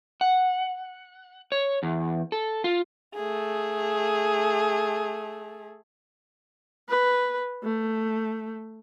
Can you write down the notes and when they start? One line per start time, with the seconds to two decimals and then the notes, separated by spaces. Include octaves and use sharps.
0.21 F#5
1.52 C#5
1.83 E2
2.32 A4
2.64 F4
3.15 A3 G#4
6.89 B4
7.63 A3